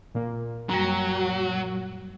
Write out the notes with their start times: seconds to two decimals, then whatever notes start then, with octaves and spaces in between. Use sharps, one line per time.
0.15 A#2 A#3
0.69 F#2 F#3 G3